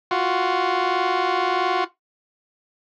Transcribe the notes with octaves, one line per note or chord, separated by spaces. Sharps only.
F4 F#4